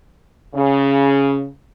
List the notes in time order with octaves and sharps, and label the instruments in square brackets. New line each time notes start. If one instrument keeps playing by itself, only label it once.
[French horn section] C#3